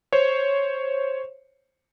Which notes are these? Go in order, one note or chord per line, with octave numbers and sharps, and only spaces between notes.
C5 C#5